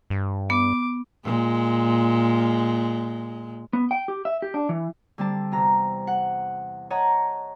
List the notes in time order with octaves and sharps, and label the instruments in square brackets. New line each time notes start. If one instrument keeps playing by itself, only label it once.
[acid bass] G2
[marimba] B3 [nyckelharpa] D6
[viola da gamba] A#2 G#3
[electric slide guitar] B3
G5
G4
E5
G4
D4
E3
[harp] D3 G3 C4 A5
E2 C3 A#5
F#5
C#5 D#5 F#5 A5 A#5